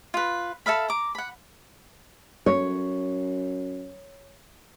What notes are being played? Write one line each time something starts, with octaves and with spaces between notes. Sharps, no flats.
F4 B4
A4 E5 F5 B5
A#5 D6
F#5 B5
F#2 C#5